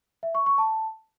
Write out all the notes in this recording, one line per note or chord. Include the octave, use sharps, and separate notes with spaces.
E5
C#6
C#6
A5